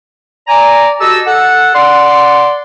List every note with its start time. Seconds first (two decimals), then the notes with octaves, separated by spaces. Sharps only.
0.47 D5 G#5 A#5
1.00 F#4 G4 A4 D#5 A5 E6
1.26 A4 F#5
1.74 D5 F#5 C6